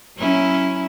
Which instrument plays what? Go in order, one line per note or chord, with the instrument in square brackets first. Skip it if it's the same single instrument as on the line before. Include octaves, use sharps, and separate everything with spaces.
[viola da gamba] F#3 C#4 E4